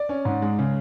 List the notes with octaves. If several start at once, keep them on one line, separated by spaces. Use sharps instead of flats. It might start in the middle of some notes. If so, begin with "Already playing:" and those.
Already playing: D5
C#4
G#2
G#3
C#3